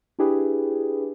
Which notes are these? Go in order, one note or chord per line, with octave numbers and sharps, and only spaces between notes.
D4 E4 G4 G#4 B4